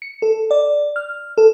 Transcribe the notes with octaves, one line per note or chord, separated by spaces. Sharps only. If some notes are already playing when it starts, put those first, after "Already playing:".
C#7
A4
D5
F6
A4